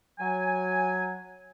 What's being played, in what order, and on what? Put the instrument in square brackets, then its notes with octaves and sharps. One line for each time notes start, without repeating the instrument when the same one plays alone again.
[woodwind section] F#3 G#5